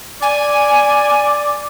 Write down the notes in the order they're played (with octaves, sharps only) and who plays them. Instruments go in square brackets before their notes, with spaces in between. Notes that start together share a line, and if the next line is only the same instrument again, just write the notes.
[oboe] D5 [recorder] G#5